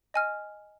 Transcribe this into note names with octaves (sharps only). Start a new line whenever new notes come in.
D#5 G#5 F6